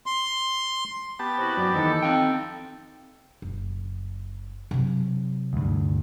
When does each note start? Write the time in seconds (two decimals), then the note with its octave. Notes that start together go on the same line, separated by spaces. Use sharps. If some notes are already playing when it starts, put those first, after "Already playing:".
0.06 C6
1.19 B3 G4 A5
1.38 C3 E4 F#4
1.57 F#2 F#4 C5 D5
1.75 D#2 E3 D#4 A4
2.02 C4 F5 G5
3.42 F#1
4.71 C3 F#3
5.53 D2 G2